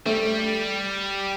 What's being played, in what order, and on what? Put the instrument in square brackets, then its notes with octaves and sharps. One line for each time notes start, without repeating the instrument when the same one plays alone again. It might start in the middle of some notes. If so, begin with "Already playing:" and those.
[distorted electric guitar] G3 [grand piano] A3